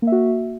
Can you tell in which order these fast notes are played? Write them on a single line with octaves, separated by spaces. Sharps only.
A#3 E5 F#4